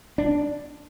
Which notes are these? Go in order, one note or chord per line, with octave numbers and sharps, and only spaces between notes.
D4